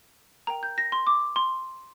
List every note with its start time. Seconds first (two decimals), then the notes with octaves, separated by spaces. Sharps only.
0.47 A#4 G5 A#5
0.63 G6
0.78 A#6
0.92 C6
1.07 D6
1.36 C6